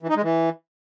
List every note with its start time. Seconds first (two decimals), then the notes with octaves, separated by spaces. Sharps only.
0.03 E3
0.09 D#4
0.16 G#3
0.23 E3